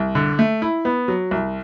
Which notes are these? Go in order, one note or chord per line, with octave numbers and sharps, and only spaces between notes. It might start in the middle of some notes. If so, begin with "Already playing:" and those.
Already playing: C2
D3
A3
E4
B3
F#3
C2